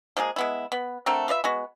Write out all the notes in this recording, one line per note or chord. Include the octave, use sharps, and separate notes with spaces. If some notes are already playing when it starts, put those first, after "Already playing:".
F3 G#3 A#3 G#4
G#3 B3 E4
B3
D3 A3 C4 A#4
F4 B4 D5 E5
G#3 B3 F#4